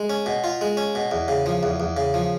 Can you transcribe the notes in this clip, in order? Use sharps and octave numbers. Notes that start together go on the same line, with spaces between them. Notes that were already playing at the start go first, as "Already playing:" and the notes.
Already playing: G#3
C#4
B2
F4
G#3
C#4
B2
E2
C#3
F3
E2
E2
C#3
F3